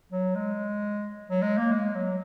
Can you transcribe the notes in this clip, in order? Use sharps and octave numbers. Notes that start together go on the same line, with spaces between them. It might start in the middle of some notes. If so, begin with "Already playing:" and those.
F#3
G#3
F#3
G#3
A#3
G#3
F#3